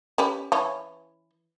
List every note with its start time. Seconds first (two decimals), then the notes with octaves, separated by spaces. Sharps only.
0.18 C#4 G4 B4
0.52 E3 C#4